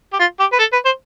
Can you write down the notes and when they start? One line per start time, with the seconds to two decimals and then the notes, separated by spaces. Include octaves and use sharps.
0.13 G4
0.19 F4
0.40 G4
0.53 B4
0.59 A4
0.73 B4
0.85 C5